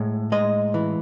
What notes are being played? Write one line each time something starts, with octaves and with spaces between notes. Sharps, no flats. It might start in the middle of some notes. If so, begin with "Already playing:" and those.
Already playing: A2 G#3
G#3 D#5
E3